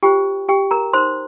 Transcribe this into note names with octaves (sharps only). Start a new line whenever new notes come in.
F4 G4 C5 G5
G4 G5
A#4 A#5
D#4 A#4 C5 C6